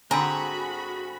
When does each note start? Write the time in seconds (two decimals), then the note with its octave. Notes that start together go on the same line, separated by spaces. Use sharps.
0.11 G#2 D3 C4 F#4 G#4 A#5 B5